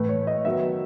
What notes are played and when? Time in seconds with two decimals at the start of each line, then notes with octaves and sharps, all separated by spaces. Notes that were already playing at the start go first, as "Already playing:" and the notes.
Already playing: A2 E3 A3 B4
0.09 C#5
0.27 D#5
0.45 D#3 F#3 B3 E5